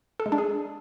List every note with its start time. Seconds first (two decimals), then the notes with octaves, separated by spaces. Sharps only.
0.20 A4
0.26 G#3
0.32 D4
0.38 G#4